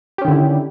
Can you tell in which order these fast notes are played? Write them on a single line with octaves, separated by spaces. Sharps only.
G4 C#4 D#3 D3 E4